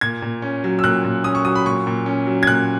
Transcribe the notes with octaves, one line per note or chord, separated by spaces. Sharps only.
A#2 G#6
A#2
C#4
F#3
E6
A#2 F#6
A#2
C#4 D#6
C#6
F#3 D#6
B5
A#2 C#6
A#2
C#4
F#3
G#6
A#2 F#6